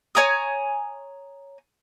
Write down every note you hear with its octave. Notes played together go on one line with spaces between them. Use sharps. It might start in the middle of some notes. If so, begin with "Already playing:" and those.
C#5 G#5 A#5 D#6